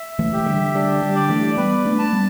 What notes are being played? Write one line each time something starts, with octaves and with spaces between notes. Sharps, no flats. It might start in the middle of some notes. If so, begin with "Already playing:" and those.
Already playing: E5
E3 A3
G4
D3 G3
D3 G3 D4
D3 G3
D5
E3 A3
G3 B3 B4
A3 D4
A5
G3 B3